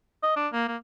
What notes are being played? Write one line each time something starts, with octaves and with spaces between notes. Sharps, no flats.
D#5
D4
A#3
A#3